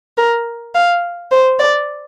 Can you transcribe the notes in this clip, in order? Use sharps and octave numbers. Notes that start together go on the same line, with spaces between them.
A#4
F5
C5
D5